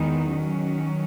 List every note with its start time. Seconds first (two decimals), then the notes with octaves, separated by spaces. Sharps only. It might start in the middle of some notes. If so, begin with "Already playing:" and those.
Already playing: E2 D#3 G#3 B3 D#4
0.27 D#3 F#3 C#4